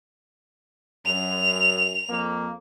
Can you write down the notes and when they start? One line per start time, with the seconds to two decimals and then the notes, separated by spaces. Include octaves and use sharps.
1.06 F#2 F7
2.09 F2 A#3